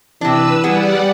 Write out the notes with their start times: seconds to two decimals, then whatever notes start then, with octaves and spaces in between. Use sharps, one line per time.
0.21 C3 E3 D4 B4 E6
0.64 G3 B3 G#4 D5 F#5